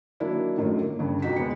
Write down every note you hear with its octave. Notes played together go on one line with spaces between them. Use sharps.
D#3 F#3 A#3 D4 E4
F#2 A2 D3 D#3 F3 F#3
A#3
G2 C#3
F2 C3 D#4 F#4 B6
D#2 G#3 B3 C#7